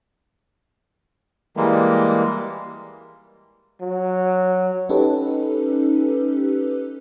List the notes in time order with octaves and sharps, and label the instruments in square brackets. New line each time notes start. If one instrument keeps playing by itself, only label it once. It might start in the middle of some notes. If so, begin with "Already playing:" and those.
[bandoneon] E3 G3 G#3 A#3
[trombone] F#3
[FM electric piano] C#4 D#4 G4 A4 B4